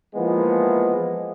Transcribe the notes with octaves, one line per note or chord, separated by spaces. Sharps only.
E3 F3 G#3 A#3 B3